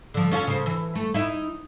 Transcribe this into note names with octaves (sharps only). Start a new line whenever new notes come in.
D3 F3
C#4 F4 A4
C#3 C5
E3
A3
D#4 E4